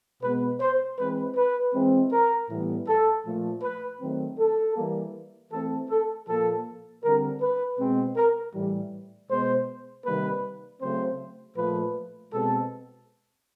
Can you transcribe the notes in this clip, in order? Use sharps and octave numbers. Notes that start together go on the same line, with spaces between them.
B2 G#3 B3 B4
C5
E3 G#3 C4 B4
B4
E3 G#3 C4
A#4
A2 E3 G3 B3
A4
A#2 F3 A3
B4
D#3 F#3 A3 C4
A4
E3 G3 A#3
E3 A3 C4 A4
A4
A#2 F3 A#3 A4
D3 G3 C4 A#4
B4
B2 G#3 C4
A#4
A2 E3 G3
B2 G#3 B3 C5
C3 D#3 G3 A#3 B4
C#3 F#3 A3 C4 C5
A#2 F3 A3 B4
B2 G#3 C4 A4